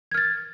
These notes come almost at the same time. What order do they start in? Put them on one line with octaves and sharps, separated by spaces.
G#6 F6 A6